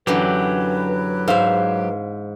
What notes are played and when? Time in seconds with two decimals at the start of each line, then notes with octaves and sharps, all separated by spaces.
0.07 F#2 D3 E3 F#3 G4 B4
1.28 G#2 C5 E5 F5